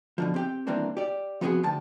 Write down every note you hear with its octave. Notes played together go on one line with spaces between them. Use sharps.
B2 D3 F3
C4 G4 G5
D#3 E3 G3 A#3 C4 D4
G4 D5
F3 G3 B3 C4 F#4 G#4
D2 G5 A5